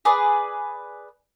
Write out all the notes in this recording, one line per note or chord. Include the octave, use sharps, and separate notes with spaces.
G#4 B4 D5